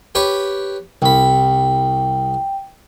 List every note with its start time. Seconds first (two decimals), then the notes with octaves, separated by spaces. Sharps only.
0.15 G4 B4 C#5
1.02 C2 G5 B5